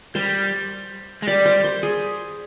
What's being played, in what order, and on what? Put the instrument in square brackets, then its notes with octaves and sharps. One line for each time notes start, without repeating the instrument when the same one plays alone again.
[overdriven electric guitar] G3 [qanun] C5
[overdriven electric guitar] G#3
[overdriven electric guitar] G3 [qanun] D5
[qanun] C5
C5
G#4